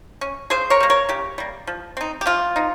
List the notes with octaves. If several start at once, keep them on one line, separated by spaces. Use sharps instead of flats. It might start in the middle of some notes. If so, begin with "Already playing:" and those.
C#4
C#3 G#4 C5
A#4 C#5
G3 A#3
A#4 C#5
C#3 G4
G3 A#3
F3
C4 D#4
G4
F3 F4
C4 D#4